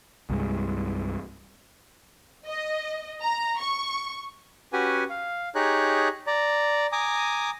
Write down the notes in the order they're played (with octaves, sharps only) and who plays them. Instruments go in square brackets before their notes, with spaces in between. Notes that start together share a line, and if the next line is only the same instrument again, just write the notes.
[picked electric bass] C2 G2 G#3
[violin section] D#5
A#5
C#6
[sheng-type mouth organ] C#4 F#4 G4 B4 F#5 G#5
F5
D#4 G4 G#4 C#5 A#5 F#6
D5 A#5
G#5 A#5 D6 D#6